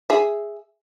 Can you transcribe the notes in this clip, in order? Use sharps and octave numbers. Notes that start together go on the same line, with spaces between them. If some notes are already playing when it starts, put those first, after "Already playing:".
G#4 E5